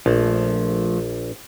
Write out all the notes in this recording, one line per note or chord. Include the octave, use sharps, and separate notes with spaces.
A#1 F3 A3